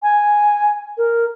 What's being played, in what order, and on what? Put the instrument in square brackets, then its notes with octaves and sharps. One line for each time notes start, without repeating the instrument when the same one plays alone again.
[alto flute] G#5
A#4